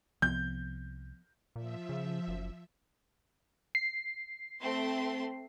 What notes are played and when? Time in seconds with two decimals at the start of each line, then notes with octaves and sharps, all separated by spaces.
0.22 C2 F3 B3 G6
1.56 A#2 F3 E5
1.89 C#3
2.28 F#1
3.75 C7
4.60 A3 C4 C6